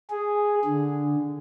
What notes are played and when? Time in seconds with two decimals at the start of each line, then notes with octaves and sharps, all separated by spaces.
0.10 G#4
0.65 D3